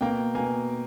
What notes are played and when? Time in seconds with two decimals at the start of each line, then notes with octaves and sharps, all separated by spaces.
0.01 B2 A#3 G5
0.35 B2 A#3 G#5